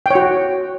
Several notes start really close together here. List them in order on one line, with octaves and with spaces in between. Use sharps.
G5 C#5 F#4